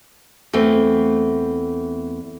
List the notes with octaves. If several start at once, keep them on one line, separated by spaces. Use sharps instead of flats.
E2 A3 C4